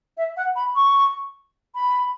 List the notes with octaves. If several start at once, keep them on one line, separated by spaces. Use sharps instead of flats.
E5
F#5
B5
C#6
B5